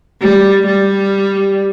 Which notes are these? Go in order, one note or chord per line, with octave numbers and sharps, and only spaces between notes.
G3
G3